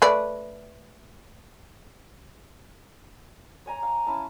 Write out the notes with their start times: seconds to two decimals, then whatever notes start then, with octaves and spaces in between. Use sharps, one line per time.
0.02 A3 B4 D5
3.66 C#5 G#5 A#5
3.83 F5
4.07 C#4 E4 A5